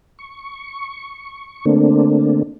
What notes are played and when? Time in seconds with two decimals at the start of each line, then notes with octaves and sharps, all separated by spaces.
0.19 C#6
1.65 D3 A3 A#3 C4 D4